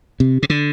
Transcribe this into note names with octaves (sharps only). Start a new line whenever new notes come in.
C3
C3
D3